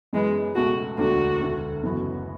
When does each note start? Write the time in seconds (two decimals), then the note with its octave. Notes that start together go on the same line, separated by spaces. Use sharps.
0.13 F#2 E3 G#3 B3
0.55 C#2 B2 A3 F#4
0.98 E1 D2 D3 A3 D4 F#4
1.40 E1 D2 D3 A3
1.83 F#1 F#2 E3 B3 F#4